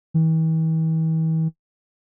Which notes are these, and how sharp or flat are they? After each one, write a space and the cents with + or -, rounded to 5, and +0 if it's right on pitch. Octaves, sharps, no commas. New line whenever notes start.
E3 -45